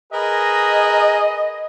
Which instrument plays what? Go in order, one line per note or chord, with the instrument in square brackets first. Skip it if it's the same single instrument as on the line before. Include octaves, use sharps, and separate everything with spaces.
[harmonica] G#4 A#4 B4 [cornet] D#5